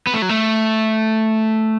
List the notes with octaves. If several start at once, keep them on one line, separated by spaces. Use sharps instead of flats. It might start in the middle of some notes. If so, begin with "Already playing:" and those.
B3
A3
F#3
A3